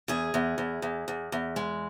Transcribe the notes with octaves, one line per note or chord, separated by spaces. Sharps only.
E2 G#4
E2
E2
E2
E2
E2
G#3